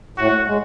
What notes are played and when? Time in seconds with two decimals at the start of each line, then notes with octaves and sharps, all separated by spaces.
0.18 A2 F#4
0.47 G#3